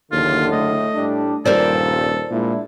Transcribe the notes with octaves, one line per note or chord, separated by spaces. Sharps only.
F#1 D#2 A2 D3 F4
A3 D#5
A2 G3 D4
D#1 G2 A#2 A4 A#4 C5 D5
A#2 G#3 D4 E4